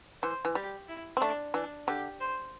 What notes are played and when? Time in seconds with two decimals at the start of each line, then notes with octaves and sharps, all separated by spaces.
0.23 E3 C5
0.45 E3
0.55 G3 G4
0.89 E4
1.17 C4
1.21 A3 D4
1.54 E3 D4
1.88 D3 G4
2.20 C5